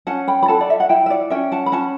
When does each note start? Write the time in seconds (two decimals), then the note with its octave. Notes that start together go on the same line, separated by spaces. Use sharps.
0.07 C#4 F#5 A5
0.28 G5 B5
0.43 B5
0.48 A4 F#5 A5
0.61 D5
0.70 E5
0.80 F#5
0.89 E4 E5 G5
1.06 E5
1.10 D5 F#5
1.30 C#4 E5 G5
1.52 F#5 A5
1.66 B5
1.72 C#4 F#5 A5